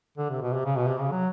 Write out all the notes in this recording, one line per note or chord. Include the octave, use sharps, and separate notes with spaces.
D3
C3
B2
C3
C#3
B2
C3
C#3
F#3